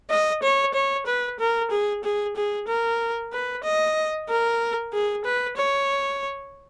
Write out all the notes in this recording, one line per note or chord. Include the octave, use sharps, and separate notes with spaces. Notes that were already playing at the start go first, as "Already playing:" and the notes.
D#5
C#5
C#5
B4
A#4
G#4
G#4
G#4
A#4
B4
D#5
A#4
G#4
B4
C#5